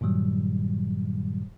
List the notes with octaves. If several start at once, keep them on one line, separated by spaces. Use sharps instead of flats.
G2 A#2 D#3 F#3 G3